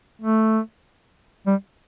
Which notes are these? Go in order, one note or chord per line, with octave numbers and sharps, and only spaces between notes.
A3
G3